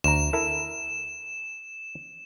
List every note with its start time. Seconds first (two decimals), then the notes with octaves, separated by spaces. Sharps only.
0.04 D2 A#5 E7
0.33 E4 A4 A#4